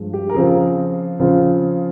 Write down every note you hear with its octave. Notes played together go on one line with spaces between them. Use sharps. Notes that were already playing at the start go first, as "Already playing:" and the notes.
Already playing: G2 F3 G#3
G4
A#4
C#3 F3 C4 F4 G#4
C#3 F3 C4 F4